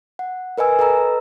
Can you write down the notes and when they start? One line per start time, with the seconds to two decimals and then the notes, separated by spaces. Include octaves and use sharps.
0.19 F#5
0.58 A#4 B4 D#5 G#5 E6
0.79 A4 B4 D#5 A#5 E6